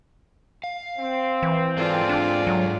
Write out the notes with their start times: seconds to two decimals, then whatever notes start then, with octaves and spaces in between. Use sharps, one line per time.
0.64 F5
0.97 C4
1.43 E3
1.77 G#2 F4 G#4 A4 D5
2.09 D4
2.47 F#3